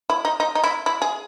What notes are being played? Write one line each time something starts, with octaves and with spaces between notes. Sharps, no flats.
E4
D#4
D#4
D#4
E4
E4
G#4